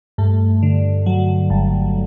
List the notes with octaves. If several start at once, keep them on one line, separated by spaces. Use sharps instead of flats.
G2 A3
D3
F#3
G1